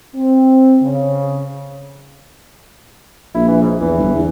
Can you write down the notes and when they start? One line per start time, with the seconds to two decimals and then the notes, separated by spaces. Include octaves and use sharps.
0.15 C4
0.82 C#3
3.35 A#1 E4
3.48 E3
3.62 G#2
3.81 E2 E3
3.98 G1
4.15 E2